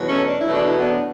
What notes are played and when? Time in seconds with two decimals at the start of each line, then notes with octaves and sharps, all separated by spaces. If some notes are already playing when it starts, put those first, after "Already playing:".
Already playing: E2 B2 F#3
0.08 A3 C#4
0.27 D4
0.40 E4
0.46 E2 B2 F#3 A3
0.53 D4
0.65 E4
0.78 B3 D4